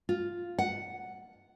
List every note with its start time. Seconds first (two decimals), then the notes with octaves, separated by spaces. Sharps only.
0.09 F4
0.59 F#5